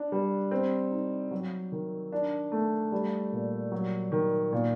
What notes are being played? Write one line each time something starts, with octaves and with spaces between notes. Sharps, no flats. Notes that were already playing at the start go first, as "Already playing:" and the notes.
Already playing: D4
G3
C4
D#4
F#3
D#3
D4
A3
G3
A#2
F#3
D#3
A#2